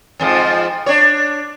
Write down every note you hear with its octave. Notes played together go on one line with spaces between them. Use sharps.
F2 G#2 F3
D4 C#5